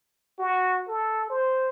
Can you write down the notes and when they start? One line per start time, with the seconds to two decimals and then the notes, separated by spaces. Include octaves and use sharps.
0.39 F#4
0.88 A4
1.30 C5